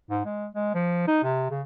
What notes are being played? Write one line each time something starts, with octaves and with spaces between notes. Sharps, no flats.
G#2
G#3
G#3
F3
D#4
C3
C#3